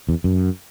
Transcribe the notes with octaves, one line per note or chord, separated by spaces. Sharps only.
E2
F#2